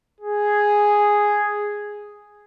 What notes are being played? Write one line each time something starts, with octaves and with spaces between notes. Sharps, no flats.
G#4